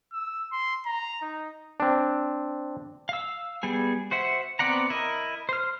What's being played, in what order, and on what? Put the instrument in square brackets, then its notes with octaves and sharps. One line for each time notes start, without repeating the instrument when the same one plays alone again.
[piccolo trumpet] E6
C6
A#5
D#4
[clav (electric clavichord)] C4 D4
[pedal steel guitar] F5 E6
G3 B3 G#4
F#4 C5 E5 F#5
B3 C4 D5 F#5 A#5
E4 A#4 D#5
C5 F6